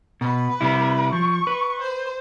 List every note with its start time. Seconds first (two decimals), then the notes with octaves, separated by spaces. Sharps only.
0.21 B2 B4
0.61 C3 G3 E4
1.13 F3 C#6
1.47 B4
1.82 C5